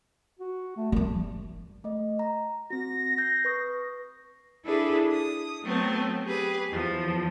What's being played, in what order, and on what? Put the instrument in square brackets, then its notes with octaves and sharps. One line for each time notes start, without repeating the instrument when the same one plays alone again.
[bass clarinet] F#4
A3
[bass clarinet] F#2 [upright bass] G3 C#4
[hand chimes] A3 D#5
A#5
[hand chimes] C4 F#4 [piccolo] A#6
[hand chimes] G6 C7
B4 C#6 D#6
[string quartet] D4 E4 G#4 A4 B4
D#6
F#3 A3 B3 C4
G4 G#4 B4
E2 F3